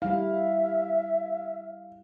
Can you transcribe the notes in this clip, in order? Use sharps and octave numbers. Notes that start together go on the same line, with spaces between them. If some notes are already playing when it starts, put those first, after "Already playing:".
G3 E4 E5 F5